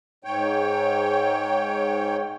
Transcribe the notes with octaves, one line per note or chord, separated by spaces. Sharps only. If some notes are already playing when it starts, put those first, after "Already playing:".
G#2 C#5 G5